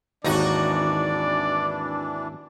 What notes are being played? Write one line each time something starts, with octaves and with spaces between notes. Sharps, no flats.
G#1 D#2 E3 D4 D#4 F#4 D5